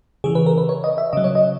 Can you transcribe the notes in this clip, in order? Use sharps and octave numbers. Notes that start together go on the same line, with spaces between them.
C#3 E3 G#4
B4
A#4
B4
C#5
D#5
E5
C#3 F#3 D#5
C#5
D#5